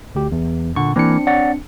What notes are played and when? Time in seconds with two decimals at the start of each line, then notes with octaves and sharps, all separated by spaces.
0.15 D2 G4
0.32 E2
0.76 A#2 D3 F#5 C#6
0.96 E3 A#3 C4 D4 C#7
1.27 C#5 D5 F#5